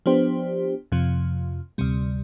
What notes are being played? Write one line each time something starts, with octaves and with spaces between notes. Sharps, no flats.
F3 B3 D4 G4 C5
F2 C3 F3
D2 C3 G3